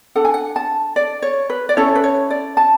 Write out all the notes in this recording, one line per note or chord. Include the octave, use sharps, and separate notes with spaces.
D4 A4 F#5
G#5
F#5
A5
D5
C#5
B4
D5
C#4 E4 A4 C#5
B4
C#5
D5
A5